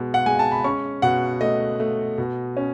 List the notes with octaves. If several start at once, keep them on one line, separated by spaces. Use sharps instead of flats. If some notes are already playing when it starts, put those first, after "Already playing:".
Already playing: B2 G#3 B3
F#5
G#3 G#5
A5
B5
C#4 C#6
B2 F#5
A3 D#5
A3
B2
C#4